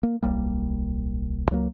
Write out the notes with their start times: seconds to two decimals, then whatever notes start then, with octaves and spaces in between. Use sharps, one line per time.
0.03 A#3
0.23 D1 B1 G3 A#3
1.51 C#2 F#3 A3 A#3